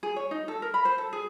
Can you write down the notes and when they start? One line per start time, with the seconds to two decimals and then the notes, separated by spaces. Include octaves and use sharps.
0.03 G#4
0.16 C#5
0.31 D#4
0.48 A4
0.62 A#4
0.74 B5
0.85 C5
0.98 A4
1.13 G#4